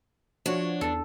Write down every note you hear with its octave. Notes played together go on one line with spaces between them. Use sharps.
F3 D4 F#4 C#5
E2 A4